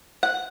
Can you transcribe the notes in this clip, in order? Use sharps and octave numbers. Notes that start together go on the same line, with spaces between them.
F#5